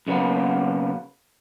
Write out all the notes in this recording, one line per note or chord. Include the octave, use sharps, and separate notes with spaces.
B1 C#3 F#3 A#3 B3